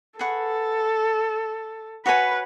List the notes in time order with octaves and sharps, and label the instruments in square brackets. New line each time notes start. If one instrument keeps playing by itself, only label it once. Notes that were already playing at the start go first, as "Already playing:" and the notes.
[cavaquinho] G#4 B4 F#5 C#6 [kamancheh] A4
[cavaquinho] F#4 C#5 G#5 B5 [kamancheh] B4